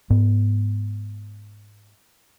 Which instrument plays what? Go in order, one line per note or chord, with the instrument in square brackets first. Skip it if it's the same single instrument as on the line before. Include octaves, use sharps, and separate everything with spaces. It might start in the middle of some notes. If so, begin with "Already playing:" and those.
[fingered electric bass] G#2 B3